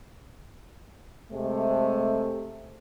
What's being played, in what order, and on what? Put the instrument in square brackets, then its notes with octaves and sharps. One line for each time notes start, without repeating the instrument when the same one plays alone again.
[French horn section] C3 G#3 A3